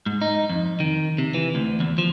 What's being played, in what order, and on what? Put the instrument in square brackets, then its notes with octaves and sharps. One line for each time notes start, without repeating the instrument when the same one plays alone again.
[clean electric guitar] G#2
D#4
F2
D#3
C3
E3
D2
E2
F3